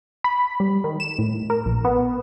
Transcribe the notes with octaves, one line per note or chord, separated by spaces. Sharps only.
B5
G3
D#3
E7
A2
A#4
A#1
B3